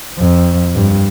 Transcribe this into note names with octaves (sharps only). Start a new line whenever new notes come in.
F2
G2